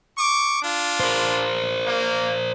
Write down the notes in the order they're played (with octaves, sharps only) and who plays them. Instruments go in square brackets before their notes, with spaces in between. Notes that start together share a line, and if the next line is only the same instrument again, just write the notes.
[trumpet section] C#6 D6
D4 F4
[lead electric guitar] A#4 C5
[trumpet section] A#3